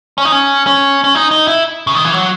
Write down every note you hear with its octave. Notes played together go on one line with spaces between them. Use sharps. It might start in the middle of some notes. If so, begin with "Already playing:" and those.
C#4
D#4
C#4
C#4
C#4
D#4
D#4
E4
C#3
D#3
E3
F#3